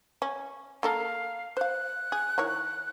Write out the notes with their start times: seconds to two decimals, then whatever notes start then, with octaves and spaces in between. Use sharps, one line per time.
0.22 C#4
0.83 A#3 A4 A#4 F5
1.57 C5 F5 F#6
2.12 G#4
2.38 D#3 E4 C#5